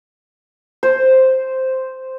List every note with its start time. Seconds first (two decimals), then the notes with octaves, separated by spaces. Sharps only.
0.83 C5